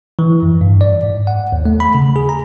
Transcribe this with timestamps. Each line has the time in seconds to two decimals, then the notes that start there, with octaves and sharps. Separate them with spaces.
0.19 E3
0.42 F#2
0.61 G2
0.81 D5
1.03 G#2
1.27 F#5
1.52 D#2
1.65 A3
1.80 B5
1.95 C#3
2.16 G#4
2.29 A#5